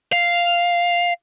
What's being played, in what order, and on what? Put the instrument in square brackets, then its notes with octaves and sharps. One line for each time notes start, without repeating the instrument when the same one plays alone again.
[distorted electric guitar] F5